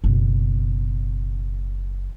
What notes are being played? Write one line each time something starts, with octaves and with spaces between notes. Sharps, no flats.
F#1 B2